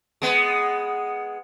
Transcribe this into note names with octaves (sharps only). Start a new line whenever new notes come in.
G#3 B3